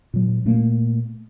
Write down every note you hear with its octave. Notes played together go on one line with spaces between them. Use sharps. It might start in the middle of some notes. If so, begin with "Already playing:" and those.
A#2 F#3
A#2 A3 A#3